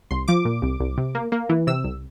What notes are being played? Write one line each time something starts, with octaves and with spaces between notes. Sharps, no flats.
C2 C6
F3 D6
A#2
C2
C2
C3
A#3
A#3
E3
C3 E6
C2